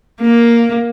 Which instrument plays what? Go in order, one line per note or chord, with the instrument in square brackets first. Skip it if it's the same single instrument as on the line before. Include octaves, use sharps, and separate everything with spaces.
[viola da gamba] A#3